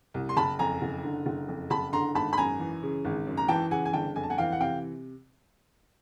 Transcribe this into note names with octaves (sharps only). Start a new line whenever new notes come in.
C2
C6
F#1 A5 B5
F2 G#5 A#5
F#1
D3
F#1
F2
F#1 A5 B5
D3 A#5 C6
G#1 A5 B5
B5
F#2 G#5 A#5
E3
C#3
G#1
F#2
A#5
E3 G5 A5
C#3 F#5 G#5
G#5
G1 G5 A5
F2 G#5
A5
F#5 G#5
E3 F5 G5
F#5
C3 F5 G5